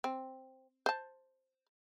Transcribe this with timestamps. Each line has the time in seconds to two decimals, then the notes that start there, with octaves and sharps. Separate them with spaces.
0.04 C4
0.86 C5 A5